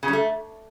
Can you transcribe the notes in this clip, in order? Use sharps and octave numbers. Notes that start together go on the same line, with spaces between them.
C#3
G3
A3